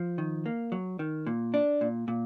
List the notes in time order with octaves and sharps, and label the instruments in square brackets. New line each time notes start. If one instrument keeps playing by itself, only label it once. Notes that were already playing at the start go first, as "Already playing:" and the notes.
Already playing: [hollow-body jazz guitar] F3
D#3
A#3
F#3
D#3
A#2
D4
A#2
A#2